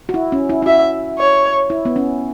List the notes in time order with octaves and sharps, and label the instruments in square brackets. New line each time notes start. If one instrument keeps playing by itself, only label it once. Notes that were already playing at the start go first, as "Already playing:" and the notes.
[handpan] F#4
E4
C#4
E4
E4
[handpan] F#4 [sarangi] E5
[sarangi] C#5
[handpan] E4
B3
C#4